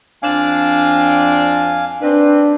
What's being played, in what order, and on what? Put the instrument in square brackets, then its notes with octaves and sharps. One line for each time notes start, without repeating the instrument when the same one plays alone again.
[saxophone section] F2 C4 D4 [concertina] F5 G#5
[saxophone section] C4 B4 [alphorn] D4